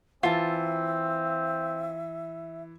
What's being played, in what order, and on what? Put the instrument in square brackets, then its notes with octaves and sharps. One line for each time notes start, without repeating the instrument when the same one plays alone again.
[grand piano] E3 [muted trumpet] C4 [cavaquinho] F4 A5 [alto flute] E5